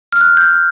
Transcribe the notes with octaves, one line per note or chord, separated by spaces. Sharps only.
F6
F#6
G6